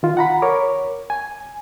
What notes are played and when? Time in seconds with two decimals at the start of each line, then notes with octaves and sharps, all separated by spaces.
0.03 D#3 F4
0.17 F#5 A#5 B5
0.42 A#4 C#5 D6
1.10 G#5